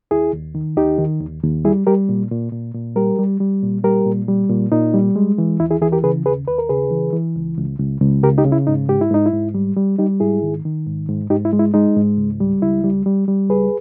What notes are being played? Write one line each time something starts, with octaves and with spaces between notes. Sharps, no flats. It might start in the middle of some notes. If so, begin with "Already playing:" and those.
D#2 E4 G#4
D#2
D#3
D#2 D#4 G4
D#3
D#2
D#2
G3 E4 G#4
G3 G4 A#4
A#2
A#2
A#2
A#2
G3 G4 A#4
G3
G3
A#2
G3 G4 A#4
A#2
G3
A#2
A#2 D#4
G3
G#3
E3
D#2 E4
E4 G#4
E3 E4 G#4
G4 A#4
C#3 G#4 B4
D#2 G#4 B4
D#2 B4
A#4
C#3 G#4 B4
E3
E3
C#2
C#2
C#2
C#2
C#3 G4 A#4
D#4 G4
C#3
E4
G#2 D#4
G#2 G4
E4
G#2 D#4
E4
G#2
G3
G3
G3 D#4 G4
G#2 E4 G#4
D#3
D#3
G#2
G#2
G#2 D#4 G4
E4
G#3
E4
G#3 D#4
G#2
C#2
G3
C#2 E4
G3
G3
G3
C#2 G#4 B4